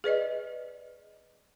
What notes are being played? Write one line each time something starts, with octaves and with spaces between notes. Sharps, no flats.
G#4 B4 D5 D#5